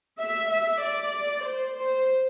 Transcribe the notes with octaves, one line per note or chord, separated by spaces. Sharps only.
E5
E5
D5
C5
C5